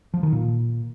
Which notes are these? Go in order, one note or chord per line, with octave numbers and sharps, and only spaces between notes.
F3
D#3
A#2